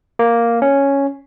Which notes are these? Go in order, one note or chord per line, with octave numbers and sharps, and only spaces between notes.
A#3
C#4